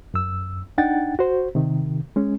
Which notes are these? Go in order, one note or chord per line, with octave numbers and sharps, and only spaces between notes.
F#2 E6
D4 D#4 F#5 G5 A6
F#4 C5
C3 D#3
G#3 C#4